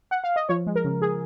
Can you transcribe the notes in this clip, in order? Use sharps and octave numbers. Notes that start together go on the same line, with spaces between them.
F#5
F5
D#5
F3 C#5
G#3
A#4
C#3
G#4